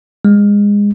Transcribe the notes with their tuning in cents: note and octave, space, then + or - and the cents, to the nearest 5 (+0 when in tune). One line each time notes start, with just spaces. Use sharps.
G#3 -25